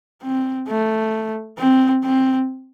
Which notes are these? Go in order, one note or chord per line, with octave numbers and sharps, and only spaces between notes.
C4
A3
C4
C4